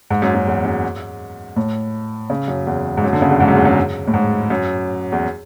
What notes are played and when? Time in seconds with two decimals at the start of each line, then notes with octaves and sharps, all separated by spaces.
0.11 G#2
0.22 F#2
0.34 F#2
0.47 E2
0.65 F#2
1.56 A2
2.30 C#3
2.48 F#2
2.67 E2
2.97 G#2
3.04 F#2
3.13 D3
3.22 C#3
3.31 E2
3.40 G#2
3.48 F#2
3.56 E2
3.65 F#2
4.07 A2
4.14 G#2
4.50 F#2
5.12 E2